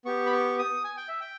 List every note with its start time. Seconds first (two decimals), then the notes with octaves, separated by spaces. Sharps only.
0.05 B3 G4 C#6
0.26 B5
0.32 C#6
0.59 D#6
0.84 G#5
0.97 G5
1.08 E5
1.21 G5